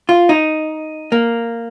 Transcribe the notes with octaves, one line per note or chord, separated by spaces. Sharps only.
F4
D#4
A#3